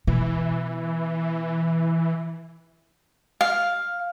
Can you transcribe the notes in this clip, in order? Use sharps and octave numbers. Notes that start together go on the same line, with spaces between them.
B2 E3
F5